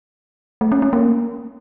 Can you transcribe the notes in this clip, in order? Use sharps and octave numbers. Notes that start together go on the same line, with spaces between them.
A3
C#4
C#4
A#3